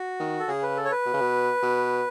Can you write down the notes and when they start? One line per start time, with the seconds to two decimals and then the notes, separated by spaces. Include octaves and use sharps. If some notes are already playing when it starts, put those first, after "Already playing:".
Already playing: F#4
0.20 D#3
0.40 A4
0.48 C#3 G#4
0.63 B4
0.77 A4
0.85 C#5
0.91 B4
1.06 B2
1.13 C#3
1.21 B2
1.62 B2